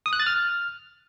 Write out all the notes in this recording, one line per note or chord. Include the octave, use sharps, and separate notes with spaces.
D#6
F#6
A6
F6